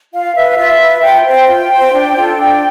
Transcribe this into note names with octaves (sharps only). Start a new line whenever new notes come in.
F4 F5
B4 E5
F5
F4 E5
B4
F4 G5
C5
G5
F4 G5
C5
D4
F4 A4
D4 G5